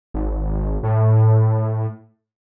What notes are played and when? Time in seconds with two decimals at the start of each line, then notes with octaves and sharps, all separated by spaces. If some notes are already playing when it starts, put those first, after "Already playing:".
0.14 G#1
0.83 A2